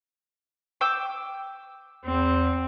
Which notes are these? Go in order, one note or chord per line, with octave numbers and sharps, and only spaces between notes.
G5 D6 E6
E2 C4